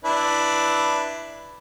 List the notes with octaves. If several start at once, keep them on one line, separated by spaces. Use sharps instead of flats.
D4 E4 B4